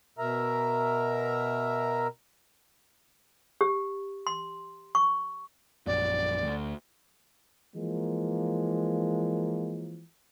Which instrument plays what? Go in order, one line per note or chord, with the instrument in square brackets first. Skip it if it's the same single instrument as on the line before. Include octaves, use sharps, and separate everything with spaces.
[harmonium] B2 A#4 E5 A#5
[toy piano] G4
C6
C#6
[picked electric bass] A#1 F#2 F#3 [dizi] D5
[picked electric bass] D2
[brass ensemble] E3 F3 G#3 A#3